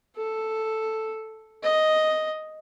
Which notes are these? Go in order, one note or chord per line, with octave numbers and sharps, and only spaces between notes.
A4
D#5